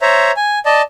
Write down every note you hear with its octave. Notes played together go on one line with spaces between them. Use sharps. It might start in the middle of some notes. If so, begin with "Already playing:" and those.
C5 C#5 E5 A#5
G#5
D5 D#5 A5